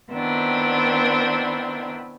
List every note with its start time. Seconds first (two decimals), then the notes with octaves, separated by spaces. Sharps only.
0.11 D#3 B3 C4 D4 E4